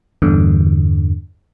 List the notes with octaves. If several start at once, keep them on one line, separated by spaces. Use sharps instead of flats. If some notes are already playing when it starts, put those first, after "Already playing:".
E2 G2 D3